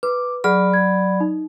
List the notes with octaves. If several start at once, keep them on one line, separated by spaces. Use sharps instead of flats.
B4 D6
F#3 G#4 D5 F#5 B5 F6
G#6
D#4